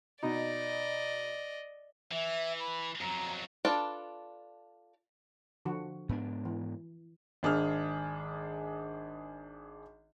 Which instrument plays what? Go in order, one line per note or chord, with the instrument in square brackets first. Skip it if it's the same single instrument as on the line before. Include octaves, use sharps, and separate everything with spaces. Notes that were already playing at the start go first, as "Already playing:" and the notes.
[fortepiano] B2 D#4 [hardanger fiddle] D5 D#5
[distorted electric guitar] E3 [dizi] E5
[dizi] B5
[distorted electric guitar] F2 F#3 [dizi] A#5
[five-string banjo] D4 F4 A4 B4 D5
[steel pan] D3 F3 F#4
[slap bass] G#2 B3 D4
[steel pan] E3
[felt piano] G#1 D4 G#4 F6